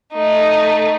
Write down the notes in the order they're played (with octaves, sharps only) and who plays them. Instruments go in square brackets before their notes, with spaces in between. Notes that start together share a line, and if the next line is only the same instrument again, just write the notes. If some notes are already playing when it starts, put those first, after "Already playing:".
[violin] A3 D#4